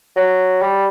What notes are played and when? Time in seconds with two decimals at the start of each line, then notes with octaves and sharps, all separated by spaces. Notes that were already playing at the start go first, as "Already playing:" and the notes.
0.16 F#3
0.61 G3